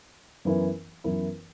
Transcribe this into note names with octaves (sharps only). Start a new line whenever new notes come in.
F#2 E3 B3 E4 A#4
F#2 E3 B3 E4 A#4